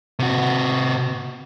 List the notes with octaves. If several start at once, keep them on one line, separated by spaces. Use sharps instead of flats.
C3 F#4